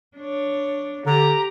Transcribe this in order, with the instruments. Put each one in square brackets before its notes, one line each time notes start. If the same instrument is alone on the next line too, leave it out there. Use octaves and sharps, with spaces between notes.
[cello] D4 C#5
[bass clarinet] D3 [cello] G4 [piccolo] A#5